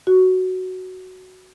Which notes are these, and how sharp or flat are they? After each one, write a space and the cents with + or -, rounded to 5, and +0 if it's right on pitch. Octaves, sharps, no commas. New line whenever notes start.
F#4 +5